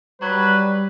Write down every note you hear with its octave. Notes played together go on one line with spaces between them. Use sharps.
F#3 G3 B4